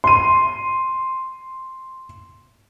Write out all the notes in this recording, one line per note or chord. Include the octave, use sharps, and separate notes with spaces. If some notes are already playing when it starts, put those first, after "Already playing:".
C6 D#7